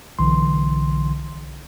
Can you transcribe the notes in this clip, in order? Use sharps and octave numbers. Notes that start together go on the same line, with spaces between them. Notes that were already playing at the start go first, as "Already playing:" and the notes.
B1 D3 E3 C6